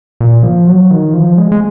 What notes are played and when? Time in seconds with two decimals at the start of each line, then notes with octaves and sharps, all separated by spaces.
0.21 A#2
0.43 F3
0.67 F#3
0.91 D#3
1.14 F3
1.37 G#3
1.52 G#3